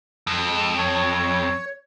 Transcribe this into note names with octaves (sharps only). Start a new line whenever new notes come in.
F2
G#3
C#5